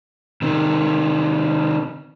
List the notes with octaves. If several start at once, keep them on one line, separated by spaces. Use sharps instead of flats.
C3 D#3